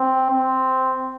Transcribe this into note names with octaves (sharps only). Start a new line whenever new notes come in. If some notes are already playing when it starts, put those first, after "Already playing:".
Already playing: C4
C4